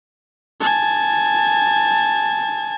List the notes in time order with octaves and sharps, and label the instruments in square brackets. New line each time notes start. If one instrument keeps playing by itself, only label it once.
[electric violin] G#5 A5